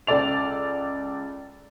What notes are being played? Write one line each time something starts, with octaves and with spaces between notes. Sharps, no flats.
C#2 A4 D5 F7